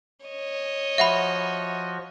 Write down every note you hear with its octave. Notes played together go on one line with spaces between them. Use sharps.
C#5 D#5
F3 F#4 E5 F#5 B5